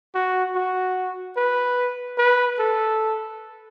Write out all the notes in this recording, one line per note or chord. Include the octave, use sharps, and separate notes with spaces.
F#4
F#4
B4
B4
A4